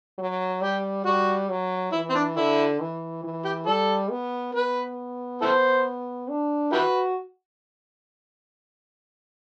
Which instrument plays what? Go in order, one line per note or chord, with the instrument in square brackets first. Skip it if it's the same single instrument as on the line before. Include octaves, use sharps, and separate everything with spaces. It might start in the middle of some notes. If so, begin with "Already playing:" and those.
[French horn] F#3
[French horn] G3 [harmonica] G4
[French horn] G3 [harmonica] F#4
[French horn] F#3
[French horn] E3 [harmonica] E4
[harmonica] C4
D4
[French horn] D3 [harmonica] E4
[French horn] E3
E3
[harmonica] G4
[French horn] G3 [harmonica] A4
[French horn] B3
[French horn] B3 [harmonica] B4
[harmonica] E4 A4 C5
[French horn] D4
[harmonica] E4 G4 B4 [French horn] F#4